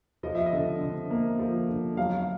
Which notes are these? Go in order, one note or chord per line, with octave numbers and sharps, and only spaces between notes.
F3 D#5
E5
D#5
D3
D3
A#3
F3
D3
F#3 F5
F5